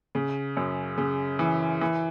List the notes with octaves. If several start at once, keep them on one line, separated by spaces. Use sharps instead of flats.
C#3
F#2
C#3
E3
E3